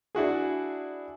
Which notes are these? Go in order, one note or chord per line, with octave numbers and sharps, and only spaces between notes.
D4 E4 F#4 G#4